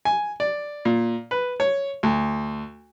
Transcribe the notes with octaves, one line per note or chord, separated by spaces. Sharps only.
G#5
D5
A#2
B4
C#5
D2